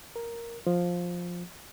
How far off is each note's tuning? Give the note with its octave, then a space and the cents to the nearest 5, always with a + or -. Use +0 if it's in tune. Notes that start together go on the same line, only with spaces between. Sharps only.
A#4 +0
F3 +10